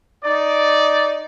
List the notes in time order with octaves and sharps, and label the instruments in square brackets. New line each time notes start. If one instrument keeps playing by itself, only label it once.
[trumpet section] D#4 D5